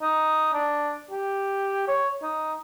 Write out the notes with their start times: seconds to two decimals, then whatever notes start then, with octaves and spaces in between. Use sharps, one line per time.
0.02 D#4
0.53 D4
1.11 G4
1.88 C#5
2.22 D#4